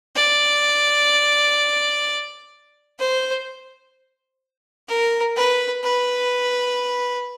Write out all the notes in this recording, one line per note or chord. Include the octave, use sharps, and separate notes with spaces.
D5
C5
A#4
B4
B4